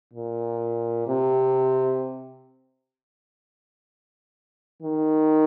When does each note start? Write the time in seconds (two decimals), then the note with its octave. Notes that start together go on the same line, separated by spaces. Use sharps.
0.13 A#2
1.07 C3
4.82 D#3